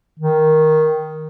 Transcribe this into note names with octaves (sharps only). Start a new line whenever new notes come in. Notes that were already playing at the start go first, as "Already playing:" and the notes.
D#3